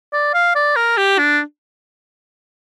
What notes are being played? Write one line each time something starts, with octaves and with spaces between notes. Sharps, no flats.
D5
F5
D5
A#4
G4
D4